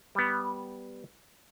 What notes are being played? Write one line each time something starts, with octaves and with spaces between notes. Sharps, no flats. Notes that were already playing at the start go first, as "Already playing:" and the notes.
G3 B3